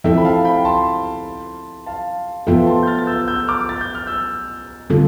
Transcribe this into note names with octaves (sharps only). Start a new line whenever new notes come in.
F3 C4 E4 A4 E5 G5
B5
F5 A5
G5 B5
A5 C6
F5 A5
F3 B3 F4 A4 E5 G5
A5 C6
G6
F6 A6
A6
E6 G6
E6 G6
D6 F6
A6
G6
F6
E6 G6
D3 G3 C4 F4 A4